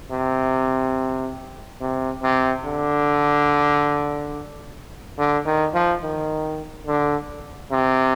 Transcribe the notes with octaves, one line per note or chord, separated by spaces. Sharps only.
C3
C3
C3
D3
D3
D#3
F3
D#3
D3
C3